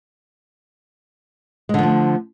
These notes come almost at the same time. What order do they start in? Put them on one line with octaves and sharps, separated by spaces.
G#3 D3 F3 A3